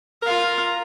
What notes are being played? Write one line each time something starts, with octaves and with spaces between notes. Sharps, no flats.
F4 A#4 F5